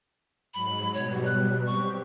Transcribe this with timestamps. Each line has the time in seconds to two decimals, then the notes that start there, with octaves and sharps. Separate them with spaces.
0.54 G#2 F#3 B5
0.94 B2 F#3 G3 C#5
1.26 F#6
1.66 C4 G4 C#6